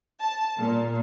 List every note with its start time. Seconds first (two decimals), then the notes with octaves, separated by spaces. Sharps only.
0.22 A5
0.59 A#2